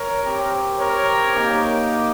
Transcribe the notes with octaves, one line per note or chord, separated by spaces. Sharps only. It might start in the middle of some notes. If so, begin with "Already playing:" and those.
Already playing: A#4 C#5
C4 G4
A#4 C#5
A#3 D#4 G4